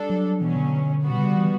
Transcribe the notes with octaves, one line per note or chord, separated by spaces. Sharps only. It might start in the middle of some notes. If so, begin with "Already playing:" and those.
Already playing: G3 D4 A4
F#3
B2 E3 F#3 C#4
D3
G3 B3 F#4
B2
C#3
D3
E3